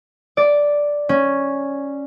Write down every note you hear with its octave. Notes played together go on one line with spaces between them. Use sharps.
D5
C#4